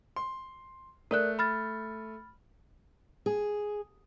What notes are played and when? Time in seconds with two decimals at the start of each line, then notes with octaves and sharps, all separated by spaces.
0.16 C6
1.11 A3 A#4 D5 F#6
1.39 B5 F6 A6
3.26 G#4